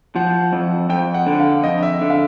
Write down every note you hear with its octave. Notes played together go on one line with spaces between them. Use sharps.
F3 F#5
F2
F2 G5
F#5
D3
F5
F2 D#5
E5
D3
F5